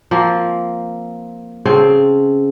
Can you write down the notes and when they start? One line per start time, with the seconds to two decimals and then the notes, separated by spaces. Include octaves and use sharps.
0.11 F3 A#3 C4
1.65 C#3 C4 A4